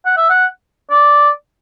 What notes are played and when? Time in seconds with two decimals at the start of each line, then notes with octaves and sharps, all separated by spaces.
0.06 F#5
0.17 E5
0.30 F#5
0.91 D5